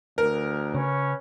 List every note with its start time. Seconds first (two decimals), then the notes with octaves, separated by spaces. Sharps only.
0.18 D2 A#4
0.74 C#3 C#4 B4 C#5